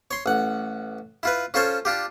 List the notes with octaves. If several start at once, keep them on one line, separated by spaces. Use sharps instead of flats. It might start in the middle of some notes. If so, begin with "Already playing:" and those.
C#5 C6
A1 F#5
E4 F4 B4
C#4 F4 A4 C5 C#5
D4 F4 G4